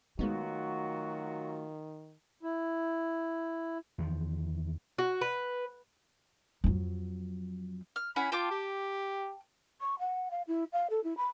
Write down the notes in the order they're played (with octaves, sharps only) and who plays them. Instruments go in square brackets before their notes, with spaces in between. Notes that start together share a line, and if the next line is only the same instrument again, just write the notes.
[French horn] D#3 [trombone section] F#3 F4 F#4 [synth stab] G#3 B3 D#4 [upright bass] A3
[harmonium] E4
[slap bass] E2 D#3 F3
[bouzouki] F#4
B4
[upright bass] F2 F#3
[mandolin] F6
[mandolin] C#4 E4 F#5 [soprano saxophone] B5
[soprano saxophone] F4 [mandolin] G5 A5 D6
[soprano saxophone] G4
[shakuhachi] C#6
F#5
F5
E4
F5
A4
E4
B5